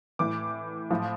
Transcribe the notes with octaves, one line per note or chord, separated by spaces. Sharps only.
A2 E3 D6
A2 F3